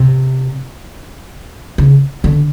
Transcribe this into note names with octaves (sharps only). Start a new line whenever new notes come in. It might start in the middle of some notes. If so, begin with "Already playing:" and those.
Already playing: C3
C#3
D3